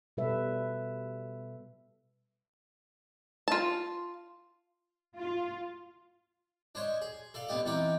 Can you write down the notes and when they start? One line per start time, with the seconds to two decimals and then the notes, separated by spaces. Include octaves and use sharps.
0.17 B2 G3 A4 B4 E5
3.48 F4 A5
5.18 F4
6.75 D4 C5 C#5 D#5
7.01 G#4
7.34 A4 D5 F5
7.48 D3 B3 D4 G4 D#5
7.66 E2 C4 D#4 F#5 G5 D6